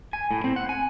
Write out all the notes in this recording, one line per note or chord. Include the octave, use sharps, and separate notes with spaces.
G#5
A2
C4
F#5
G#5